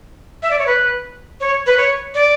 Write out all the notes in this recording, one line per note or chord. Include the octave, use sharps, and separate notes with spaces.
E5
D5
C#5
B4
C#5
B4
C#5
D5